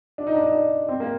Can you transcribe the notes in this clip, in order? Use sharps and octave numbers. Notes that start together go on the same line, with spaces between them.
D4
D#4
D4
D#4
D4
C4
A#3